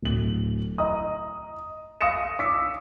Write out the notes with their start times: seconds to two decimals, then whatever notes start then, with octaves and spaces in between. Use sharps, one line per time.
0.02 D1 F#7
0.78 D#5 A#5 D#6
2.01 F5 D#6 A#6 C#7 E7
2.39 D6 E6 B6 C#7